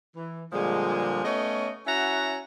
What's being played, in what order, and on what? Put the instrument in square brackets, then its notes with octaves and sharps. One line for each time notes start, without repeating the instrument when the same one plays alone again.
[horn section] E3
A#2 D3 F3 G3 G#3
A3 B3 C#4 C#5 D#5
C#4 E4 F#4 E5 F#5 A#5